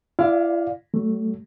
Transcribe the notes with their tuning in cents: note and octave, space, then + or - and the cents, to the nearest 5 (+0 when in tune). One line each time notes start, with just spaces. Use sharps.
E4 +40 D5 +0 F5 +15
F#3 +40 A3 +0